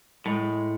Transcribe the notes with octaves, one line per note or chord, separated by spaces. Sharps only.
A2 G#3